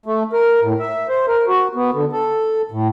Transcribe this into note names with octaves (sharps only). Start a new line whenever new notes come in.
A3
A#4
A2
E5
C5
A#4
F#4
B3
D3
A4
A2